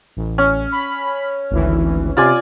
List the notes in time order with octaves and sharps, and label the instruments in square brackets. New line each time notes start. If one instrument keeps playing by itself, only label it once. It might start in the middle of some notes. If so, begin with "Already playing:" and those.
[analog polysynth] A1
[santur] C#4
[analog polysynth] B5
G#1 D2 E3
[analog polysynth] C3 [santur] F4 D5 G#5